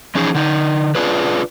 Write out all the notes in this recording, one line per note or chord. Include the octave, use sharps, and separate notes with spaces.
E3 F3 C#4 D#4 G#4
D3 D#4
D4 F4 G#4 B4